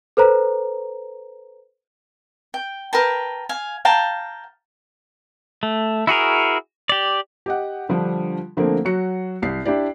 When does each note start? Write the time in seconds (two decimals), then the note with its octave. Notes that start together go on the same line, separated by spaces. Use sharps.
0.17 A4 B4 C5 A#5
2.54 G5
2.93 A#4 B4 G5 A5
3.49 F5 G#5
3.85 F5 G5 A5 A#5
5.63 A3
6.07 E4 F#4 G#4 A#4
6.89 G4 D5
7.46 G4 D#5 F#5
7.89 D3 F3 G3 D4
8.57 D3 F3 A3 A#3 C4
8.85 F#3 F#4 C#7
9.42 C2 C7
9.65 D4 E4 G4 D5